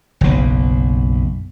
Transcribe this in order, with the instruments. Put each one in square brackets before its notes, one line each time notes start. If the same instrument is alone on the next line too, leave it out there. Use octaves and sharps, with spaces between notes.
[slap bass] F#1 B1